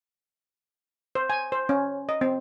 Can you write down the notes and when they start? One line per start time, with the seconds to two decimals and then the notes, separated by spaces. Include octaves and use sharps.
1.15 C5
1.30 G#5
1.52 C5
1.69 C#4
2.09 D#5
2.21 C4